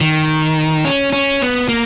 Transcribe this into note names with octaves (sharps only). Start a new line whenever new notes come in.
D#3
C#4
C#4
B3
A#3